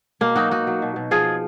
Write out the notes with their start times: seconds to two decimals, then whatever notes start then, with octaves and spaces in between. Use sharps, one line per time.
0.21 B2 A#3
0.36 F#3 D#4 F#4
0.51 F#3 D#4 F#4
0.67 F#3
0.82 B2
0.96 B2
1.11 F3 F4 G#4